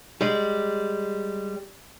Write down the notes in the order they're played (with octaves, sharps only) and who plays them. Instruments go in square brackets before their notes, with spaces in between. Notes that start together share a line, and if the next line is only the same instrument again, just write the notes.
[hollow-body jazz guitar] G3 G#3